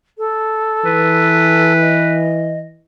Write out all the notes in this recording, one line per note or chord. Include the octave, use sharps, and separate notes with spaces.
A4
E3 B4
D#5